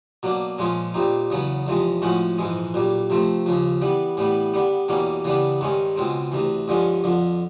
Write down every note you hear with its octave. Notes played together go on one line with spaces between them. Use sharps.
B2 F#3 A#3 D4
A#2 F3 G#3 C#4 F4
A#2 G3 C4 D#4
E2 C#3 F#3 B3
E2 C3 F3 G#3
A2 F3 G#3 C#4 F#4
A#1 G#2 E3 G#3
B1 A#2 G3
C3 F3 A3 C4
D#2 C#3 F3
E3 G3 B3
A2 E3 G3 B3
D3 G3 B3
E2 B2 G3 A#3 C#4
C#3 E3 G3 B3 D4
G2 D#3 G#3 C#4
C#2 B2 G#3 C4
D2 C3 E3
G2 D3 F3 G#3 C#4
F2 D3 F3